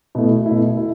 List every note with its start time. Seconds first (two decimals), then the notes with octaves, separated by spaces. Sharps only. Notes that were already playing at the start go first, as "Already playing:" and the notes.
0.15 B2 A3 E4
0.46 B2 A3 E4
0.77 E4